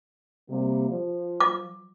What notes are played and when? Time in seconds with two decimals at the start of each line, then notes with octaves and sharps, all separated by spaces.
0.49 C3 G3 A#3
0.88 F3
1.40 D6